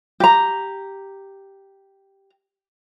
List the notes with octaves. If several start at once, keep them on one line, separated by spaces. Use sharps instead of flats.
G4 A#5